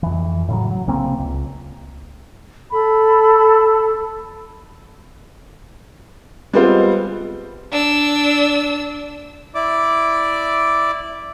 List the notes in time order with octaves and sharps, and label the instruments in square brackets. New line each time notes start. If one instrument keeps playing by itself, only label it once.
[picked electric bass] F2 E3
A2 C#3 F#3
F#3
C2 C#3 A#3 C4
C#2
[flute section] A4 B5
[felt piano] G3 G#3 B3 C4 F4 C5
[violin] D4 E6
[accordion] E4 D5 D6